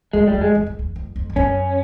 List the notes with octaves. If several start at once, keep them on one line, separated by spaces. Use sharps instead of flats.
F2 G#3
E2 G3
F2
G#3
E2
F2
E2
F2
F2
F2
F#2 C#4